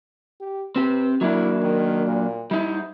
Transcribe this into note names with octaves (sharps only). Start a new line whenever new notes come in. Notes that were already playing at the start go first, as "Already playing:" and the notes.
G4
C4 G4 B4
F#3 A#3 D4 E4
D#3
A#2
G3 D#4 E4